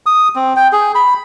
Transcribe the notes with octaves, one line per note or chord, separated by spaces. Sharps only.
D#6
C4
G5
G#4
B5